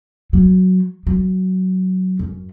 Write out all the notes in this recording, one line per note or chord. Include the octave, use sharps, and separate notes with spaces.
F#3
F#3
F#2